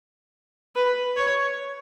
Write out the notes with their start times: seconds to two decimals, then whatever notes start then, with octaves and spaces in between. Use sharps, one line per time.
0.76 B4
1.17 C#5